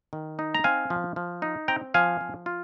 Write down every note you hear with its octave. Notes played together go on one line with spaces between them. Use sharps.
D#3
D#4
A#5
C4 F5 G#5
F3
F3
D#4
C4 G5 A#5
F3 F5 G#5
F3
F4